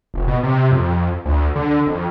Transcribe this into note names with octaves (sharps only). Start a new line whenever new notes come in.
F1
B2
C3
F2
D2
D3
F2